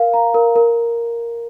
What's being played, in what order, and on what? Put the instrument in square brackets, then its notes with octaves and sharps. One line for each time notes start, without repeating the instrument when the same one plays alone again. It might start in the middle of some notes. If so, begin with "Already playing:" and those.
Already playing: [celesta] A#4 F5
A#5
A#4
A#4